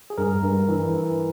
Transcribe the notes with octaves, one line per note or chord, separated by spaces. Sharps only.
G#4
G2 A#4
G2
E3
E3